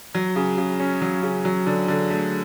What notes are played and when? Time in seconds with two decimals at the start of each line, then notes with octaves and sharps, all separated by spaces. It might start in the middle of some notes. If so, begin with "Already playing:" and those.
0.15 F#3
0.36 C#3
0.58 C#3
0.80 C#4
1.02 F#3
1.23 C#3
1.45 F#3
1.66 D3
1.88 D3
2.10 A3